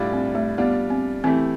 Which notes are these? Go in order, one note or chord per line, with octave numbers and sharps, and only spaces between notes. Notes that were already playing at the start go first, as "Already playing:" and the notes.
Already playing: A2 G3 D4 F4
C4
A3
G3 B3 D4 F4
C4
E3 A3 C4 E4 G4